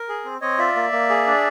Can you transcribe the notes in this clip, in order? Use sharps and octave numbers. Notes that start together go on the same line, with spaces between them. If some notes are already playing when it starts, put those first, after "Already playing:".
Already playing: A#4
G#4
C4
C4 C#5 D#5
F4 D5 E5
A#3
A#3
G#4
D4